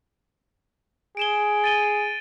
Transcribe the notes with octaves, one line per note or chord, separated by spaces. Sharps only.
G#4 D7 E7 G7
A6 D#7 G7